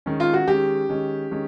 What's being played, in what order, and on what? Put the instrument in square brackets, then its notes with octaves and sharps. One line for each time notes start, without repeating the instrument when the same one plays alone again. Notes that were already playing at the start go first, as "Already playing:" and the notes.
[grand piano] D#3 G#3 C#4
[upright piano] F4
F#4
[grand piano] D#3 G#3 C#4 [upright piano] G4
[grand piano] D#3 G#3 C#4
D#3 G#3 C#4